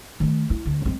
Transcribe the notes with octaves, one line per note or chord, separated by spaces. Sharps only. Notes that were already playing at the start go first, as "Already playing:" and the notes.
D#3 A3
E4
D2
G#3 C4